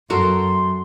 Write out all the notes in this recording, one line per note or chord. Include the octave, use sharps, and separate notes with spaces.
F#2 F#4 A4 A#4 C6